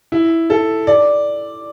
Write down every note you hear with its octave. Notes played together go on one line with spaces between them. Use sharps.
E4
A4
D5